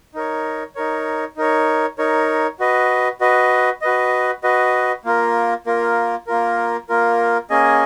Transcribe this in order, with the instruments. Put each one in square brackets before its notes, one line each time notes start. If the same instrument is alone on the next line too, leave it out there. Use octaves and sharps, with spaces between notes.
[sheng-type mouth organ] D#4 A#4 C#5
D#4 A#4 C#5
D#4 A#4 C#5
D#4 A#4 C#5
F#4 B4 D#5
F#4 B4 D#5
F#4 B4 D#5
F#4 B4 D#5
A#3 F4 A#4
A#3 F4 A#4
A#3 F4 A#4
A#3 F4 A#4
A#3 C#4 G#4 D#5 G#5